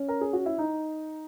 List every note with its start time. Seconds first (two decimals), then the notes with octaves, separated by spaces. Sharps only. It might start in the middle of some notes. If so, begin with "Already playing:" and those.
Already playing: C#4
0.08 A#4
0.21 G#4
0.33 F#4
0.46 E4
0.58 D#4